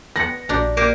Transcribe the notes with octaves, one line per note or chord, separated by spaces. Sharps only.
B3 F#5 A#6 C#7
A#1 D4 F#4 G4 D5 A#5
A#3 G4